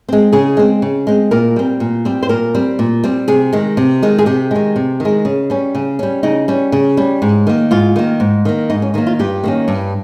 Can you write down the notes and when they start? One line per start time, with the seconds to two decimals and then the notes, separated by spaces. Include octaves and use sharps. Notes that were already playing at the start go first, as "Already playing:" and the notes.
0.09 G#3 C4
0.32 C#3 G#4
0.57 G#3 C4
0.82 C#3
1.07 G#3 C4
1.31 A#2 A#4
1.56 G3 C4
1.80 A#2
2.05 G3 C4
2.23 C5
2.29 A#2 A#4
2.55 G3 C4
2.79 A#2
3.04 G3 C4
3.28 C3 G#4
3.53 D#3 G#3
3.77 C3
4.03 D#3 G#3
4.19 G#4
4.26 C3 G4
4.51 D#3 G#3
4.76 C3
5.00 D#3
5.05 G#3
5.25 C#3
5.50 G3 C#4
5.75 C#3
5.99 G3 C#4
6.23 C#3 D#4
6.48 G3 C#4
6.72 C#3
6.97 G3 C#4
7.22 G#2
7.47 D#3 A#3
7.71 G#2 F4
7.96 D#3 A#3
8.20 G#2
8.45 D#3 A#3
8.70 G#2 D#4
8.82 C#4
8.94 D#3 A#3 D#4
9.07 F4
9.19 G2 G4
9.44 D#3 A#3 C#4
9.68 G2